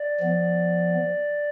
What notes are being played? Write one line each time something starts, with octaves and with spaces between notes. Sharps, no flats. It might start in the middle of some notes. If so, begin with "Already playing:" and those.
Already playing: D5
F3 B3